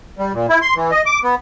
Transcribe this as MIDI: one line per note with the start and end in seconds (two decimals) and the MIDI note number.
0.19 0.33 55
0.34 0.46 46
0.49 0.59 64
0.62 0.74 84
0.76 0.91 52
0.91 1.02 75
1.06 1.19 86
1.23 1.35 59